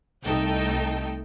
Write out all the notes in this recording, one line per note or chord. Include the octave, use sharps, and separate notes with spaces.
C2 A3 D#4 A4 G5